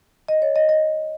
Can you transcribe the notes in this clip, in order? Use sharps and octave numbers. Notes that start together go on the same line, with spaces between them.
D#5
C#5
D#5
D#5